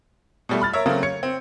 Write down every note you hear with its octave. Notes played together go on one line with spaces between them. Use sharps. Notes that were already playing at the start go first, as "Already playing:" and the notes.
B2 G3 A3
B5 F6 A6
A#4 C#5 E5
C#3 F#3 A3 A#3 C4
C#5 G#6 C#7
C4